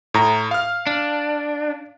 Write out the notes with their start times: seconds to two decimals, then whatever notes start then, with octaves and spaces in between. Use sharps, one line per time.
0.14 A2 A#5
0.51 F5 F6
0.87 D4